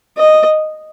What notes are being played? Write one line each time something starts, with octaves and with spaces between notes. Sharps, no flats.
D#5